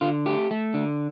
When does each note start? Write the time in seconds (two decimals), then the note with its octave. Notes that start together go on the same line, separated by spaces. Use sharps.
0.01 D3 F4
0.26 A3 G4
0.51 A3
0.74 D3